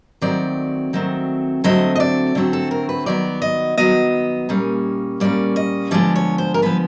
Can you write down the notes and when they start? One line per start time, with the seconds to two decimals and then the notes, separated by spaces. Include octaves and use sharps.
0.21 D#3 F#3 A3 C4 D5
0.93 D#3 F#3 A3 C4
1.64 D3 F#3 A3 C4 D#5
1.96 D#5
2.00 D5
2.35 D3 F#3 A3 C4
2.53 A4
2.71 A#4
2.89 B4
3.06 D#3 F#3 B3 D5
3.42 D#5
3.78 D#3 F#3 B3 D#5
4.49 A#2 G3 A#3 C#4
5.20 A#2 G3 A#3 C#4 D5
5.56 D#5
5.91 D3 F3 G#3 B3 D5
6.15 C#5
6.38 C5
6.54 A#4
6.62 D3 F3 G#3 B3 B4